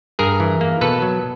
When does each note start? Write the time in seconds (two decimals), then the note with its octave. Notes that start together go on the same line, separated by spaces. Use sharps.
0.19 G2 G#4 A#4
0.40 E3
0.61 A#3
0.81 B2 A4 B4
1.02 F#3